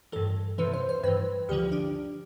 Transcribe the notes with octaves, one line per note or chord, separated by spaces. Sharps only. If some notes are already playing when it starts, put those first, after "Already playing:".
G2 E3 A4
E2 C3 E3 B4
C5
C5
G2 E3 B4
D2 D3 F3 G4
D4